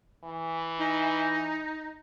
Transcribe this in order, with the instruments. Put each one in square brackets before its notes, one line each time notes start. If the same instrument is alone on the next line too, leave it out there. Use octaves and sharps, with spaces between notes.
[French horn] E3
[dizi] D#4